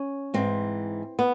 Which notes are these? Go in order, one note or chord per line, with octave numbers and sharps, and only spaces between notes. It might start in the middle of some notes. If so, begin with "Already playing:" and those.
Already playing: C#4
G#2 E3 C4
B3